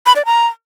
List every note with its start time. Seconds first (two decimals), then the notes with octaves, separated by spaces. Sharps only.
0.06 B5
0.16 D5
0.26 A#5